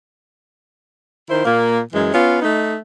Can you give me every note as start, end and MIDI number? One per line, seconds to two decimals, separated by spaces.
1.29 1.42 51
1.29 1.42 64
1.29 1.42 72
1.45 1.80 46
1.45 1.80 58
1.93 2.09 42
1.93 2.09 52
1.93 2.09 56
2.13 2.41 59
2.13 2.41 61
2.13 2.41 65
2.42 2.75 57
2.42 2.75 63